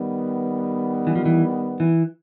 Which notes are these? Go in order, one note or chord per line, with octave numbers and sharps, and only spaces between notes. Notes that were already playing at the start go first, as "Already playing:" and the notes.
Already playing: D#3 G3 B3
E3
F3
E3
E3